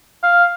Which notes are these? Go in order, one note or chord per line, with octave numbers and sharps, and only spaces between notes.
F5